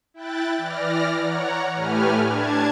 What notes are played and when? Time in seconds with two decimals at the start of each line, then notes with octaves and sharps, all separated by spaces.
0.14 E4 G5 F#6 A6
0.58 E3 D5 F6 A#6
1.21 C#5 F#5 A#5
1.75 A2 A3 G4 B4 G#5 F6
2.25 D4 A5 G#6